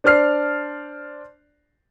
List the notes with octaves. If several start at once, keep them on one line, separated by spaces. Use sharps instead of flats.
D4 C5 D5 F6 C7